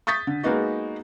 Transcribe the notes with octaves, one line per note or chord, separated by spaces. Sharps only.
C#6 D#6 G6 A6 B6
D3
G#3 A#3 B3 D#4 F#4